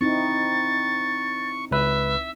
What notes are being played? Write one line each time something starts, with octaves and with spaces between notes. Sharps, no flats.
C4 D#4 E4 C#6 A6
C#2 B4 E5